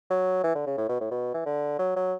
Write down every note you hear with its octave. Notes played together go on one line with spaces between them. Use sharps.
F#3
E3
D3
C#3
A2
B2
A2
B2
E3
D3
F#3
F#3